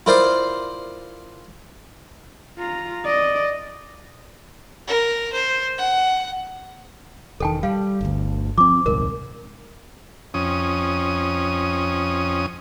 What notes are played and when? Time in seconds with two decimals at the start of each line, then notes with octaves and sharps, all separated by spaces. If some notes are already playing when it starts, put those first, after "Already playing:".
0.06 E4 F4 A#4 C5 D5 F5
2.58 F4 A#5
3.05 D5 D#5
4.87 A#4
5.33 C5
5.78 F#5
7.40 E1 D#3 A4 G5 A5
7.63 G3 F5
8.01 G1 D2
8.58 F3 C4 D6
8.86 D#1 C2 G#2 A#4
10.34 F2 C#4 D#6